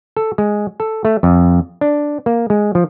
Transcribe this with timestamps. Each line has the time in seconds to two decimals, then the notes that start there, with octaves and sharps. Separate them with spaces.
0.17 A4
0.38 G#3
0.80 A4
1.05 A3
1.23 F2
1.81 D4
2.26 A#3
2.50 G#3
2.75 F3